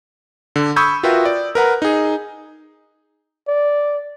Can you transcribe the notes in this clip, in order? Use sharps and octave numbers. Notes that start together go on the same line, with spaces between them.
D3
B5 C#6 D#6 E6 G6 G#6
F4 F#4 A#4 B4 E5 G5
D5
A#4 B4 F#5 A#5
D#4 G#4
D5